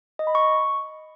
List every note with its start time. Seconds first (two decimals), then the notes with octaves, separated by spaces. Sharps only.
0.19 D#5
0.27 B5
0.35 C#6